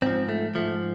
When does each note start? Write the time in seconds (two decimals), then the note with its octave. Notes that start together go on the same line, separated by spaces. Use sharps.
0.02 G#2 F3 C4
0.29 A3
0.55 G#2 F3 A3